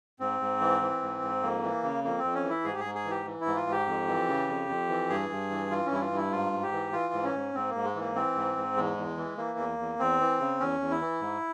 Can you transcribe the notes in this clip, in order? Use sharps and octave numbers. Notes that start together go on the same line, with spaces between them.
G#2 C4
G#2
E3
E3
G#2
G#2
F2 A#3
E3
C#3
F2 A#3
C4
F2
C#4
E3
E4
G#2 G#4
G4
G#4
G#2
G#4
E3
G4
E3
E4
G#2
F4
G#2 G4
F2
E3
C#3
F2
F2
E3
G2 G#4
G2
E3
E3 F4
C#4
G2 E4
F4
G2
E4
G#2 F4
G#2
G4
E3
E3 F4
G#2
C#4
G#2
G#2 C4
G#2 A#3
G#3
E3
A#3
E3 C4
G#2
G#2
E2 G#3
E2
E3
E3 A#3
E2
E2
E2 C4
E3
C#3
E2 C#4
E2
E4
E3
G#2